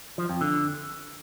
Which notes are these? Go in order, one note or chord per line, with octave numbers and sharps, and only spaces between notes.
F3
F2
D3